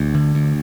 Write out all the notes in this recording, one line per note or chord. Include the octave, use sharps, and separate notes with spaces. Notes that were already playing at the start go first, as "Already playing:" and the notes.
Already playing: D2
D3
D2